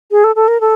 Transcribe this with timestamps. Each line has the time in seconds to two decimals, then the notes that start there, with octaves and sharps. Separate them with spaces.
0.11 G#4
0.24 A4
0.36 A4
0.48 A#4
0.61 A4